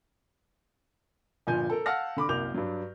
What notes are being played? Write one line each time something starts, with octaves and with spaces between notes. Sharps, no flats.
G1 A#2 F3 G#5 G6
A4 A#4
F5 F#5 A5 E6 F6 A#6
D3 B5 D6
C2 F#2 A#3 D6 G6 F7
G2 F#3